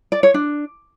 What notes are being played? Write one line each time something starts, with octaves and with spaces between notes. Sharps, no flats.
D5
C#5
D4